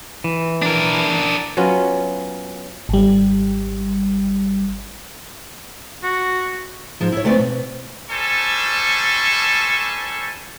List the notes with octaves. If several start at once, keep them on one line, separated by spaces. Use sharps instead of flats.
E3
D4 A#4
F#3 B3 C#4 F4
G#1 G3
F#4
G#2 F3 G#3
E4 C#5
D2 A3 B3 C4 D5
B2
G3 A4 C5 G#5 A5 C#6